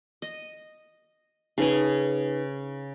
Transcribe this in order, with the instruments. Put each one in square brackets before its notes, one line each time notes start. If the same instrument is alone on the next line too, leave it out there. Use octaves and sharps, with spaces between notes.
[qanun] D#5
[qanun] C#3 G#4 [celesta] D#4 B4